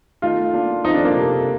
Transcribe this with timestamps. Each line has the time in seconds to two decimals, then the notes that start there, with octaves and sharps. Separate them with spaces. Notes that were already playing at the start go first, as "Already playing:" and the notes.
0.22 D#3 A3 D#4 F4
0.54 D#3 A#3 D4
0.84 F3 C4 D#4 F4 A4
0.94 D4
1.05 A#3
1.15 C3 G3 D4 A4